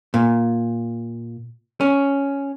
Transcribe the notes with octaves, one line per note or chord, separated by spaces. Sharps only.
A#2
C#4